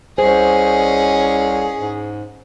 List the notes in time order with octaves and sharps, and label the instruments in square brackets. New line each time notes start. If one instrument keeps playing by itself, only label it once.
[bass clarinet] C2 [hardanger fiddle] C#4 D#5 [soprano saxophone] G#4 [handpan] C5
[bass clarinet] G#2